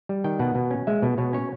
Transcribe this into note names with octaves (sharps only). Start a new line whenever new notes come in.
G3
D#3 G5
B2 F#5
B2
C#4
G#3 E5
B2
B2 C#5
C#4 C#5